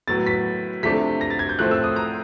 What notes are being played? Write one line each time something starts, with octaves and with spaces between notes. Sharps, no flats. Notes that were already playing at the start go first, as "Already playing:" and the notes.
A2 F#3 B3 A6
B6
C3 F3 A3 D4 B6
A#6
A6
G#6
G6
A2 F3 A3 C4 F#6
E6
D#6
A#5